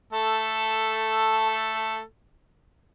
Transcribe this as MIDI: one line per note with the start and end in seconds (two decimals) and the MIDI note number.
0.13 2.01 57
0.13 2.01 69